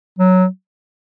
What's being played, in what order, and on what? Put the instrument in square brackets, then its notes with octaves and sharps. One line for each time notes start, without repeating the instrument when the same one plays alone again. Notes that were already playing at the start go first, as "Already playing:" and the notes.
[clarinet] F#3